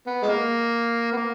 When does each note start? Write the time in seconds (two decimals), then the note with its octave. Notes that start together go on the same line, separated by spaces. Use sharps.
0.07 B3
0.22 G#3
0.28 A#3
1.12 B3
1.17 A#3